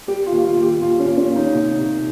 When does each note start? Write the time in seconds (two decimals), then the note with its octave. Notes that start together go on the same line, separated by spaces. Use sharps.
0.07 G3 G4
0.26 F4
0.32 D#2
0.44 F4
0.57 D#2
0.63 G4
0.82 D#2 F4
0.99 C#4
1.05 D#2
1.17 C#4
1.30 D#2
1.36 D#4
1.54 C2
1.79 C2